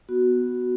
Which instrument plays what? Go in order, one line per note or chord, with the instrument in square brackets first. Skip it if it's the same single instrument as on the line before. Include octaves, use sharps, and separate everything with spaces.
[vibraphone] B3 F#4